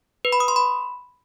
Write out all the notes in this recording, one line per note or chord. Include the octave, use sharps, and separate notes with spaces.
B4
B5
D#6
C6
B5